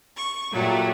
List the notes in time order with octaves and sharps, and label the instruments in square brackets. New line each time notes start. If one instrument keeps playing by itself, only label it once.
[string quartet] C#6
A#2 F#3 G3 A3